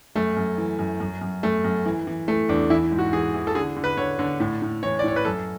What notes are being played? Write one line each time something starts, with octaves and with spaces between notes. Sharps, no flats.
F#2 A3
F#2
E3
F#2
F#2
F#2
F#2 A3
F#2
E3
E3
E3 A3
E2 D4
E3 E4
G#2
F#4
E3 G#4
E3
A4
D3 G#4
D3
B4
D3 C#5
D3
A2
A2
E3 C#5
D5
A2 C#5
B4
F#2 A4